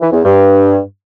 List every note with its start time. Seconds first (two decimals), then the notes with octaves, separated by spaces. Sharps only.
0.01 E3
0.12 E2
0.24 G2